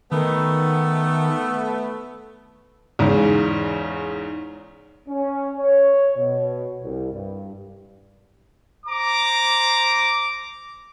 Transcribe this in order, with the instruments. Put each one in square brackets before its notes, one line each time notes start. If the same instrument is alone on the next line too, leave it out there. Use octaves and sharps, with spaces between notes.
[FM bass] D#3 [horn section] A3 B3
[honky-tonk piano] E2 G#2 C#3
[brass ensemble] C#4
C#5
B2
C2
G2
[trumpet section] C5 A#5 D6